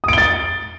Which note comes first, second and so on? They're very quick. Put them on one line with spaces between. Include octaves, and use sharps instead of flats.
D#6 D7 G7 A6